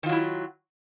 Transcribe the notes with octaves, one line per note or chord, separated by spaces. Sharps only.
D#3 F#3 E4 F4